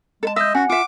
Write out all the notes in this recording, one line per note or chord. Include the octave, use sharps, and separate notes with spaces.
G#3 A4 A5
D#5 E5 E6 G6
C#4 F#4 F#5 G#5
F4 E5 D6